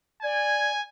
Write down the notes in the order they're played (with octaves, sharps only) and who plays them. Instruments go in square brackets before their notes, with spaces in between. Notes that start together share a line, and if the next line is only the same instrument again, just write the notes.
[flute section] D5 G#6 [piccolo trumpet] G#5